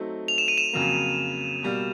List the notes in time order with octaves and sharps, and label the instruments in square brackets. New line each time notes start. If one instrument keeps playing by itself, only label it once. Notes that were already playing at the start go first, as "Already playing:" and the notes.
Already playing: [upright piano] F#3 A3 C4 D#4
[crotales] F7
E7
D#7
E7
[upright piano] F2 C#3 F#3 A#3
B2 G3 A#3